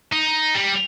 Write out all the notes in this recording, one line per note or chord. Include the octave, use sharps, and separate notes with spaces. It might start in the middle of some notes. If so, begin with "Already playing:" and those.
D#4
G3